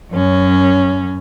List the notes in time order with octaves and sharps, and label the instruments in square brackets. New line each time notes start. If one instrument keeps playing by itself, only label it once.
[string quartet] F#2 C#4